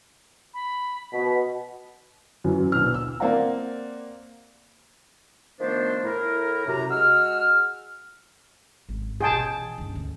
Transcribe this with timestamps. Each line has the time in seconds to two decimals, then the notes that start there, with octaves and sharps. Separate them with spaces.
0.54 B5
1.13 B2 B6
2.44 F#2 E3 F#3
2.72 A#1 B2 F6
2.94 E6
3.20 A#3 C4 D5 F#5 A#5
5.60 D#3 F3 A3 B3 D4 C5
6.03 A2 E4 A#4
6.66 F#2 C3 A#5
6.90 G#3 F#4 E6 F6
8.89 G#1
9.21 B2 E3 G#4 G5 A5
9.78 G1 C#4
9.95 D2